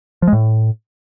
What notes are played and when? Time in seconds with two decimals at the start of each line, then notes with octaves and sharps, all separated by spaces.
0.22 F3
0.28 G#3
0.33 A2